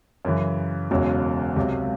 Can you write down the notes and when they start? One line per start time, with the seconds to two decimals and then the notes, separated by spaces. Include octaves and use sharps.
0.25 F#2 C#3 E3
0.91 E1 E2 C#3 F#3
1.56 C#2 C3 F#3